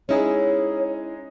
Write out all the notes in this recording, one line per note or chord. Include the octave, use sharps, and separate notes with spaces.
G#3 C#4 D#4 E4 G#4 C#5